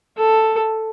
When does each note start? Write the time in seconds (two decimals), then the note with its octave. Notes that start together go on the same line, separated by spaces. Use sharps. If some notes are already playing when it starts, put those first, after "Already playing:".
0.17 A4